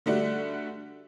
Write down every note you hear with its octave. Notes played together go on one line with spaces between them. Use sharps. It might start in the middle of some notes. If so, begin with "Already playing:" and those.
D3 G3 A3 D4 F#4